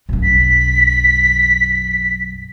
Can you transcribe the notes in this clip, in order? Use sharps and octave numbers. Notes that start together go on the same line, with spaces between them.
B1 F#2
B6